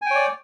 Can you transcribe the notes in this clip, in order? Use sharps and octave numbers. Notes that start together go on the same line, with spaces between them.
C#5 D5 G5 G#5